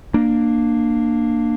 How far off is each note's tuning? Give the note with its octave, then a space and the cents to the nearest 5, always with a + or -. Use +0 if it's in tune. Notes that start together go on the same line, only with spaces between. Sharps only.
A#3 +0 D4 +20